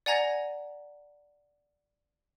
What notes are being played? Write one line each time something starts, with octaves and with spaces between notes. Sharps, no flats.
D5 F#5 G#5 A#5 G#6 A#6